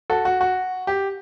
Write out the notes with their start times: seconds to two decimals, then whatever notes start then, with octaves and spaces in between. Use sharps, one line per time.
0.10 F#4 A4
0.25 F#4
0.41 F#4
0.87 G4